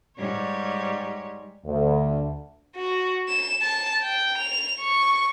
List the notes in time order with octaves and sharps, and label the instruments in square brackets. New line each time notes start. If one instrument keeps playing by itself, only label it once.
[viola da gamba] G#2 G3 C#5
[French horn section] D2
[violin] F#4
E7
A5
G5
F7
C#6